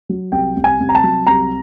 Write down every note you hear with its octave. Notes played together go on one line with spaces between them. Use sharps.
F#3
C2 G5
C2
G#5
C2
A#5
A5
F#3
C2 A#5